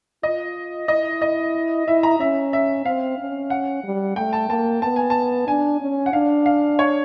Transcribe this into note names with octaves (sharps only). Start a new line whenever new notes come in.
F4 D#5
E4 D#5
D#5
E4 E5
A#5
C#4 E5
E5
C4 F5
C#4
F#5
G3
A3 G5
A5
A#3 A5
B3 A5
G#5
A5
D4 G#5
C#4
F#5
D4 F5
F5
C#5